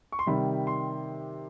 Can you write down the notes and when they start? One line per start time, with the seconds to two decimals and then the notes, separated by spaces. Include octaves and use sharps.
0.12 C#6
0.19 C6
0.27 C3 D#3 G3 B5
0.67 C6